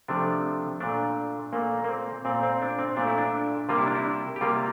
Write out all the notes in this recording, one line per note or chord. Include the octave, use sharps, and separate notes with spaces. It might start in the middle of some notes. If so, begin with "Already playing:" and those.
C3 F3 A3 D4
A#2 A3 D4
A#2 A3 A#3
A#3
C4
A#2 A3 C4
C4
D4
C4
A#2 A3 D4
E4
D4
C3 G3 A#3 F4
E4
D4
E4
G4
C3 G3 A#3 F4